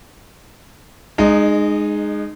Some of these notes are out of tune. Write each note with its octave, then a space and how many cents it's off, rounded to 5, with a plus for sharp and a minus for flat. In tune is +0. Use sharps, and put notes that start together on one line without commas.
G#3 +0 D#4 -25